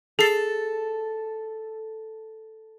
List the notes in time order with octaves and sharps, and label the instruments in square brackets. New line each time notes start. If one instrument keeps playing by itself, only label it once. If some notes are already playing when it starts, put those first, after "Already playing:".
[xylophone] G#4 C7 [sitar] A4